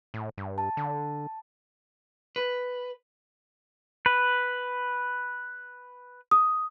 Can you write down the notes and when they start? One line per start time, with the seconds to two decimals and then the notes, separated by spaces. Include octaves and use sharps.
0.14 A2
0.38 G2
0.58 A5
0.77 D3
2.36 B4
4.06 B4
6.31 D#6